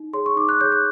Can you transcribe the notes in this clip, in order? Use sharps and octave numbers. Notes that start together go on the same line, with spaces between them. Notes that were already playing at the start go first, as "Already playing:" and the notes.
Already playing: D#4
G#4 C#5 C6
C#6
D#4 D6
F#6
G#4 C#5 G6
F#6